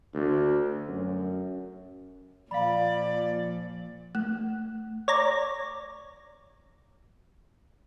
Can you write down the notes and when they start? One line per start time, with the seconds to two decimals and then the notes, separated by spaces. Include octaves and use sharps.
0.14 D2
0.88 F#2
2.51 A#2 F3 D5 F5 B5
4.15 A3
5.08 C#5 D5 A#5